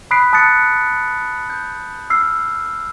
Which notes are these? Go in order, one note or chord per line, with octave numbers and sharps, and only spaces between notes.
B5 D#6 F#6 B6 C7 D7
A5 D#6 F#6 A6 C#7
G6
E6 F6 C7